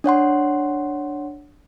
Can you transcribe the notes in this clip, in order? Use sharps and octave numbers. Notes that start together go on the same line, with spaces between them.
D4 C#5 F#5 C6